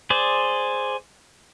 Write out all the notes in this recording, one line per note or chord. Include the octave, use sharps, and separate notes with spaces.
G#4 C5 D5